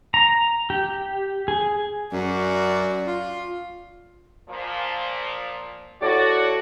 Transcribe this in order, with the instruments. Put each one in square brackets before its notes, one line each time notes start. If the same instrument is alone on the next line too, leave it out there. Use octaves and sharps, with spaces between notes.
[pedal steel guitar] A#5
G4
G#4
[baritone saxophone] F#2 [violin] F#4 D5
[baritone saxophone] F4
[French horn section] A#2 F3
[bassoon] A2 [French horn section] F#4 [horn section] A4 C#5 D5